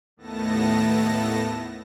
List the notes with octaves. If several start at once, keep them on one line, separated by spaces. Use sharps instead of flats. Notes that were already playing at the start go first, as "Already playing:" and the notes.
D#2 A2 A3 B3 A5 A#6